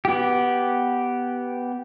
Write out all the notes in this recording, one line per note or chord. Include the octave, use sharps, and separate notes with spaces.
B3 G4